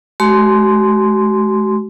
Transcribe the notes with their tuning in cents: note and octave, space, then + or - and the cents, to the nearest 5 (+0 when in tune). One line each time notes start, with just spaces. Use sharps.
G#3 +40 F#4 +45 C6 -10